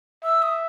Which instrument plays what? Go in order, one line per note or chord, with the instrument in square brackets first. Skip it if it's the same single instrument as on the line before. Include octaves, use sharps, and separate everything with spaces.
[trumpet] E5 [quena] E6
[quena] D#6